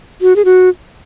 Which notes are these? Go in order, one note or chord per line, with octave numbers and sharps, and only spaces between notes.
F#4
G#4
F#4